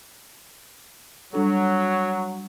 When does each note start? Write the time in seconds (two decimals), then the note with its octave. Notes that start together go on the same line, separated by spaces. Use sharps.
1.33 F#3 G3 D4 A4